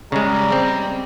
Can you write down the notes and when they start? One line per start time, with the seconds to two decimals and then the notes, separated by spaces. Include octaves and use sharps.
0.12 C#3 G3 G#3 A#5
0.52 C4